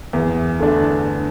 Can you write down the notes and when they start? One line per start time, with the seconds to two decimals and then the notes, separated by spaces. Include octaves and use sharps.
0.13 E2
0.60 D3 A3 D4